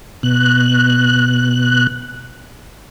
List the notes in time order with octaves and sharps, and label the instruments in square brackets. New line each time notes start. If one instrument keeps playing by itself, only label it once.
[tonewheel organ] B2 F#6